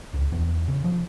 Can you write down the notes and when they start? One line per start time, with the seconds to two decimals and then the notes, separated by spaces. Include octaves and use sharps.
0.14 C#2
0.32 E2
0.68 C#3
0.84 F3